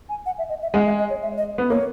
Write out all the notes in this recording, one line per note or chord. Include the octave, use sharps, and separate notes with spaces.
G#5
F#5
E5
D#5
E5
G#3 F#5
E5
D#5
C#5
E5
D#5
B3
A#3 C#5